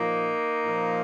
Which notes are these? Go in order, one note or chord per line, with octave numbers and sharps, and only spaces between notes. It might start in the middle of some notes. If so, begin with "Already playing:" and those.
Already playing: A#2 F3 A#3 D#4
A#2 F3